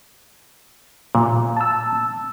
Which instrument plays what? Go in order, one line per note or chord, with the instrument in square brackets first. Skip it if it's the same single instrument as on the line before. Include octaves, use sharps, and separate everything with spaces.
[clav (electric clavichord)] A#2
[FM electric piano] A5 E6